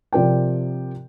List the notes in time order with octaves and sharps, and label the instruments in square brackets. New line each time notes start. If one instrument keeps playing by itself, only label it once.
[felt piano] C3 F3 A#4 D5 G5